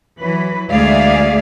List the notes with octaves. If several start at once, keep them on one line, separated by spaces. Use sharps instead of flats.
E3 F#3 B4
D2 G#3 G#4 D5 E5 F5